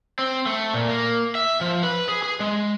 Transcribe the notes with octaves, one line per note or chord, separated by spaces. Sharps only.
C4
A3
A#2
A#3
E5
F3
B4
G#4
G#4
G#3